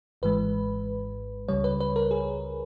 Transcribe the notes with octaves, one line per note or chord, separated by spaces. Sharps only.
G#1 G#2 E3 G#3 B4
C#2 C#3 G3 C#5
B4
B4
A#4
G#4